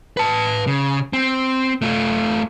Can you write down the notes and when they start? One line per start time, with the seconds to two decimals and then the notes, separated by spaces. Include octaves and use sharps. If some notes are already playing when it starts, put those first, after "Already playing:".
0.17 B4 A5
0.67 C#3
1.13 C4
1.82 A3 F4